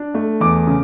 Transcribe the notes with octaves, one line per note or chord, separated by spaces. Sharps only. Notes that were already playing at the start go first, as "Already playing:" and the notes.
Already playing: D4
A3
E2 D6
C#3